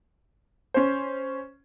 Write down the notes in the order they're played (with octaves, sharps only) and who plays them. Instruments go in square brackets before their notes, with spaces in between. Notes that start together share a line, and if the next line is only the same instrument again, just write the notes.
[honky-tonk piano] C#4 C5